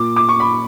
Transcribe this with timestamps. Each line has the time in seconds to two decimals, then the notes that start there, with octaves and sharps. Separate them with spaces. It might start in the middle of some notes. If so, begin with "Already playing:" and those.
Already playing: A#2 D6
0.16 D6
0.29 C#6
0.40 B5